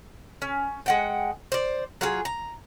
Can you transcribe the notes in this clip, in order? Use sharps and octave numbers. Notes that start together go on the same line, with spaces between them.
C#4
G#3 F#5 G5
C5 D5
F#3 F4 G#4
A#5